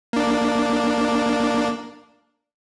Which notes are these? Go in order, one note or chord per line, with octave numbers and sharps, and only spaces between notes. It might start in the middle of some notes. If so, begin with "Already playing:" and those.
A#3 D4